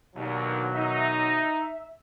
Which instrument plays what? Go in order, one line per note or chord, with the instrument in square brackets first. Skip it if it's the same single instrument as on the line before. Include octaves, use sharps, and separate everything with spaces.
[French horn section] D#2 D3 [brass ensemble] B2 D#3 F#3
[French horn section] D#4 [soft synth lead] E5